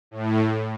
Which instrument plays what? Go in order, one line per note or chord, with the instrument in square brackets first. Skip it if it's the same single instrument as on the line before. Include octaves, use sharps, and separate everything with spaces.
[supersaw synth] A2